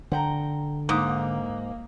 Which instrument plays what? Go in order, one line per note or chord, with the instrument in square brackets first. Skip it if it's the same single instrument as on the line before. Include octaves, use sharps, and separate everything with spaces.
[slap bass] D3 [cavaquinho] F#5 G5 A#5
[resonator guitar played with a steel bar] G#2 [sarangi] A#3 [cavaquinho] D6 D#6